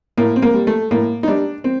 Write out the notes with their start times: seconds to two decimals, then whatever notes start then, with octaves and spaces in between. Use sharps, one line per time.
0.18 A2 A#3
0.36 C4
0.42 A#3
0.54 G3
0.67 A3
0.91 A2 A#3
1.23 D#4
1.28 G3 D4
1.64 C4